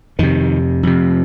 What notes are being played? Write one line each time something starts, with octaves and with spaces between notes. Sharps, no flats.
F2 C3 D#3
F2 C3